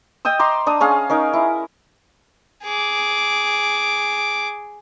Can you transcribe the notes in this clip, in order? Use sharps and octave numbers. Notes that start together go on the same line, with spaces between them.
D#5 G5 D#6 E6
A#5 C6 D6
D4 A#5 D#6
C#4 G#4 F5
C#4 D#4 A#4
E4
G#4 D6